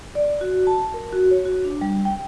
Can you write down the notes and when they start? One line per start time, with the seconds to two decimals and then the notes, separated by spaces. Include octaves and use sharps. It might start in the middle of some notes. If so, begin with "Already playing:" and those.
0.15 D5
0.41 F#4
0.67 A5
0.94 A#4
1.13 F#4
1.31 C#5
1.45 F#4
1.65 D4
1.81 G3
2.05 G5